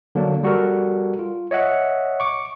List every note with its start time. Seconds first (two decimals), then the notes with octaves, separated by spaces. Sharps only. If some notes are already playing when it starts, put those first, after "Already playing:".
0.15 D3 F#3 A#3 D4
0.43 G3 F#4 A4 A#4
1.19 F4
1.51 C#5 D#5 E5 F#5
2.20 C#6 D6